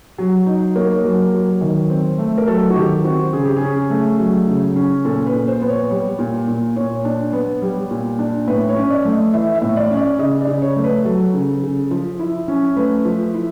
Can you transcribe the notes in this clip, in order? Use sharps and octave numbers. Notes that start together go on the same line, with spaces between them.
F#3
D#4
A#3 C#5
F#3
F#3
D#3
C4
A3
A#4
F#3 A4
F#4
D#3 G4
C4 F#4
C#3 G#4
G4
G#4
C#4
A3
F#3
C#3
C#4
A#2 A4
B4
A#2
C5
B3
C#5
G3
A#2
A#2
A#2 C#5
D4
B3
G3
A#2
D4
A2 B4
C#5
C#4
D5
A3
D#5
E3 E5
E5
A2
D5
C#4
D5
C#3 D#5
D5
C#3
C#5
A3
B4
F#3 A4
C#3
C#3
F3
E4
C#4
A3 B4
F3
E4